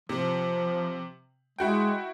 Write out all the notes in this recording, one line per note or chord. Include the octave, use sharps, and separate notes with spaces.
C3 F3
G#3 E4 F#4 G5